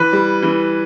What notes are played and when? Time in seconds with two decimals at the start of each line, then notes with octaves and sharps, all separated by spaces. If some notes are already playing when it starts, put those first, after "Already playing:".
Already playing: E3 B4
0.13 G3
0.42 E3